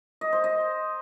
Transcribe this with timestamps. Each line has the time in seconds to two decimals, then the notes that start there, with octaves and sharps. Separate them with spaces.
0.21 D#5
0.33 C5
0.44 D#5